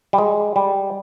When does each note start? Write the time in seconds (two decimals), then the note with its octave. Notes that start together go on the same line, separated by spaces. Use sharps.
0.13 G3
0.18 G#3
0.56 G3